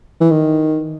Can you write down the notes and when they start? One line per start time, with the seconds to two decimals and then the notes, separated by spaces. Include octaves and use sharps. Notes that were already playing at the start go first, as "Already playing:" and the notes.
0.21 E3
0.31 D#3